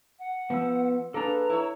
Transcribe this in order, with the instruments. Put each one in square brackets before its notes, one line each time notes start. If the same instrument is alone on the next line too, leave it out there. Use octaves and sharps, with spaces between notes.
[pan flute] F#5
[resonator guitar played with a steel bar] F3 [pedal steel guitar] B3 E6
[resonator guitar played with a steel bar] A#3 D4 G#4 [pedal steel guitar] A4 B4 [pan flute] A#5
[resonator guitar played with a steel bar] E4 C#5